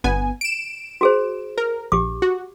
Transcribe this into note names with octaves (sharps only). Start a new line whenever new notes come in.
G1 B3 G#5
D7 E7
F#4 G#4 C5
A#4
A#1 G4 D6
F#4